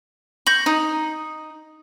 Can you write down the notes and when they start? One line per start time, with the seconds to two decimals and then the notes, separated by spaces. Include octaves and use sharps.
0.47 C#6 G6 A#6 F#7
0.66 D#4